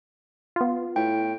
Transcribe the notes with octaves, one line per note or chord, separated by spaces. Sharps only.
B3 F4
A2 G5